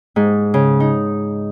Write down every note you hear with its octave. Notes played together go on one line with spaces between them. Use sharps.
G#2
C#3
D#4